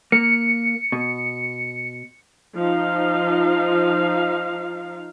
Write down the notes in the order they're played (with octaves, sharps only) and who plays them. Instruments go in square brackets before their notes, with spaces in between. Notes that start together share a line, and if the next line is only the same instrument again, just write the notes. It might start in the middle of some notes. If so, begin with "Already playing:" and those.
[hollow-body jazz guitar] A#3 [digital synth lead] C#7
[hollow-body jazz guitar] B2
[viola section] F3 D#4 F5